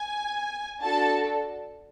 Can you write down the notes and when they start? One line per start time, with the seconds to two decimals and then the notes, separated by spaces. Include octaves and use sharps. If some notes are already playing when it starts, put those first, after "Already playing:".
Already playing: G#5
0.80 D4 F#4 A4 A5